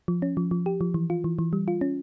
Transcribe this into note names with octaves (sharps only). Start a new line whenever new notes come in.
F3
C#4
F3
F3
G4
F3
E3
F4
E3
E3
G3
F4
C#4